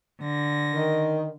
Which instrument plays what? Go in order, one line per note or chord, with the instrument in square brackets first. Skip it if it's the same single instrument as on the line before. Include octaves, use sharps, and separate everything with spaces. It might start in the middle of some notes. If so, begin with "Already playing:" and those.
[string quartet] D3 A#6
[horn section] D#3